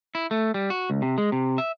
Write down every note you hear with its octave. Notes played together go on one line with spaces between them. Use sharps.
E4
A3
G3
F#4
C#2
C3
G#3
C3
E5